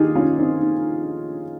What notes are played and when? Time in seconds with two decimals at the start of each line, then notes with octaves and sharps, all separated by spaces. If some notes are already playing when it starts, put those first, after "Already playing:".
Already playing: D#2 D#3 D#4 F4 G4 G#4
0.15 C#4 F4
0.38 C4 D#4
0.59 D#2 D#3